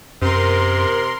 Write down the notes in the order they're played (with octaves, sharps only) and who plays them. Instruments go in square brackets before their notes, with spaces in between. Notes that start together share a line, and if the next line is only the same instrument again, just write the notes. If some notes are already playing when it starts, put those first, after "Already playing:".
[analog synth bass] F#2 [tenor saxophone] C3 [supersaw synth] A#4 C6